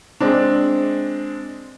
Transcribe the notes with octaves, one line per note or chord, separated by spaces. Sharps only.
G#3 C4 D4